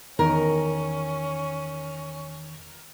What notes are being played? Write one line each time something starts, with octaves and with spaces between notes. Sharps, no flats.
E2 D#3 C#4 A#4